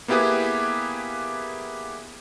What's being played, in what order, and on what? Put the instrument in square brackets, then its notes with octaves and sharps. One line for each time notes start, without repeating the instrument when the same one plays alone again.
[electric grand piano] A#3 B3 E4 G4 G#4 B4